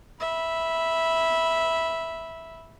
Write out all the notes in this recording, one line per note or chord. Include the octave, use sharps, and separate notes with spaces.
E5 B5